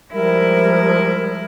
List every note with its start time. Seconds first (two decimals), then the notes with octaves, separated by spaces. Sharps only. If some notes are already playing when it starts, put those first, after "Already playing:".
0.13 F3 G3 G#3 E4 A#4